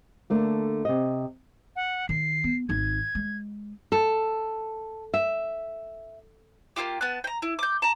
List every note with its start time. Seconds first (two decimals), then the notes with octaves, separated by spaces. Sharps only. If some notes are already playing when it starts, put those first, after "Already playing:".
0.30 D3 A3 A#3
0.85 C3 D#5
1.76 F#5
2.09 D#3 C7
2.44 B3
2.69 G#1 D#4 G#6
3.15 G#3
3.92 A4
5.14 E5
6.76 A#3 E4 F4 G4
7.01 B3 A5 F#6
7.24 G5 A#5
7.42 E4
7.59 D6 G6
7.82 A5 A#5